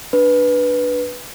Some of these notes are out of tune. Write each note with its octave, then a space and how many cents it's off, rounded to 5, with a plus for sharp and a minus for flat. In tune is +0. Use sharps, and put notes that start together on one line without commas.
D4 +0 B4 -5